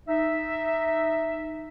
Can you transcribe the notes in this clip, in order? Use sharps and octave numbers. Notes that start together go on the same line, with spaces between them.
D#4 E5